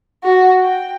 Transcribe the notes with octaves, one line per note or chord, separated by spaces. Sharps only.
F#4
G5